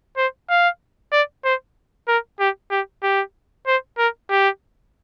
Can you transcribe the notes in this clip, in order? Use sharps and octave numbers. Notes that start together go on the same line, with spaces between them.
C5
F5
D5
C5
A#4
G4
G4
G4
C5
A#4
G4